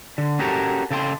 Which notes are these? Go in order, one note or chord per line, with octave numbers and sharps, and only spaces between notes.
D3
C#4 F#4 G4 A4 A#4 C#5
C#3 A4 G5 C6